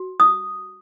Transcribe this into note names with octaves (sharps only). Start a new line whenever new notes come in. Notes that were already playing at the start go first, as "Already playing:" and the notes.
Already playing: F#4
D#6